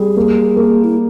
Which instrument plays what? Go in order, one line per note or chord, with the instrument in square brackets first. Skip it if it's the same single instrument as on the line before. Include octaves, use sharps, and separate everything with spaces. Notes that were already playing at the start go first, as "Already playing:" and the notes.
Already playing: [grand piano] G3 [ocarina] G#4
[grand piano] A#3
A#3
[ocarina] E4